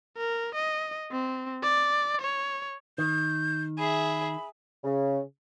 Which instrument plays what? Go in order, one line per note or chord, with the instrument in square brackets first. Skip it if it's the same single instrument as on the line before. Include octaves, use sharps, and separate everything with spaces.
[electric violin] A#4
D#5
C4
D5
C#5
[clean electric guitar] D#3 [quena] G6
[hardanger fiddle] G#4 E5 [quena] B5
[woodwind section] C#3